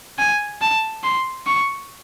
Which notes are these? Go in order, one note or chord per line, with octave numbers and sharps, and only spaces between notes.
G#5
A5
C6
C#6